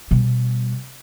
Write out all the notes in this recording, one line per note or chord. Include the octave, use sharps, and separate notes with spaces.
B2 G3